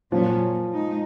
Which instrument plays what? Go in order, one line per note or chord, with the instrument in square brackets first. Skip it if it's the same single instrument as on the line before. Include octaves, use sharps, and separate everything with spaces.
[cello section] A#2 F#3 C#4 [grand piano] F3
[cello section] G#3 D#4